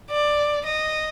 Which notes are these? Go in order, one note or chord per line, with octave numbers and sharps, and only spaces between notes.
D5
D#5